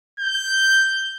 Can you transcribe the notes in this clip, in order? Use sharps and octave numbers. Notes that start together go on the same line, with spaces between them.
G6